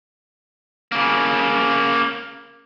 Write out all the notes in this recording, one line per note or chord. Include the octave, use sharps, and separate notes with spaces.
C#3 A#3